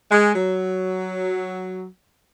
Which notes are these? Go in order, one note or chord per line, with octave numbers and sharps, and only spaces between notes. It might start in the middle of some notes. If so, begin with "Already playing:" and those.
G#3
F#3